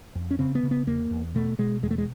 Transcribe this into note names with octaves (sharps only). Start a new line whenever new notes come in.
F2
C#4
C#3 C4
B3
C#3
B3
E2 A#3
E2
B2 A3
B2 G#3
E2 G#3
A3
G#3